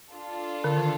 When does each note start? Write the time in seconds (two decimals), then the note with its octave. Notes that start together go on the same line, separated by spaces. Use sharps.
0.11 D4 F4 A4
0.64 D3
0.77 D#3